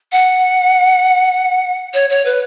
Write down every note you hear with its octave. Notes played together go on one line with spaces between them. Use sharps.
F#5
C#5
C#5
B4